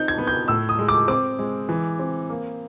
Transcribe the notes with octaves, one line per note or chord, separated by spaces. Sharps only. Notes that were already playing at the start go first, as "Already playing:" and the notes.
Already playing: C4 D#4 G6
G#6
B3
G6
A2 E6
D#6
G#3
D6
C4 D6
G#3
E3
C4
A#3